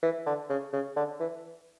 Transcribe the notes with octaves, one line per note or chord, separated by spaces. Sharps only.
E3
D3
C#3
C#3
D3
E3